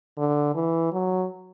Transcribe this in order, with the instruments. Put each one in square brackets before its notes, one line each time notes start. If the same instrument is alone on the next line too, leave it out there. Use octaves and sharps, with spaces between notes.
[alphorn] D3
E3
F#3